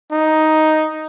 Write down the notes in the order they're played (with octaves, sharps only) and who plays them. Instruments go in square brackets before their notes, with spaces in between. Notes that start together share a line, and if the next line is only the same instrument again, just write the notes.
[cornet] D#4